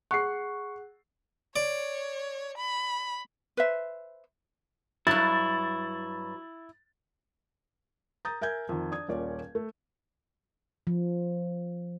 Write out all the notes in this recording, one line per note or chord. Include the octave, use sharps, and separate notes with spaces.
G#4 F#5 C#6 F#6 C7
C#5 D5
B5
B4 C5 E5
G2 F#3 E4 A6
A#5 D#6 G6 A6
A#4 E5 G#5 G6 G#6
F2 D#3
D4 D#6 G#6
D#1 A#2 C#4 D5
A3
F3